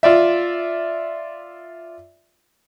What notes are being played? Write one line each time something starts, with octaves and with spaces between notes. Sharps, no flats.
F4 D5 E5